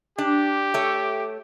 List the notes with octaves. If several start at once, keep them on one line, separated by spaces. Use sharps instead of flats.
D4 G4
A3 C#5